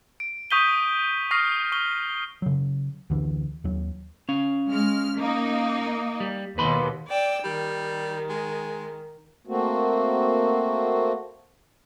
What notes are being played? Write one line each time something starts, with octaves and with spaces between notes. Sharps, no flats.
D7
C#6 D#6 G6 B6 D#7 G7
C#6 D#6 F6 A#6 C7
C#6 G7
C#3 F#3
D2 D3 E3
D#2 F#3
C#4 F5
G#3 F6
A#3 D#4
G3
D#2 B2 B4 B5 C6
D5 G5 E6
D#3 G3
G#3
A3 A#3 C4 F#4